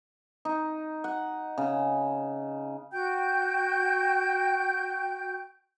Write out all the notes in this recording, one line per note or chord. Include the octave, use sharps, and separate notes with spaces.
D#4
F#5
C#3
F#4 G5 G6